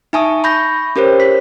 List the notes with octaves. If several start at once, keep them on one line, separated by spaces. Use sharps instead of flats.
D#4 E5 G#5 A5 C#6 D#6
B5 C#6 G6 A#6
C#4 G4 A#4 C5 C#5
B6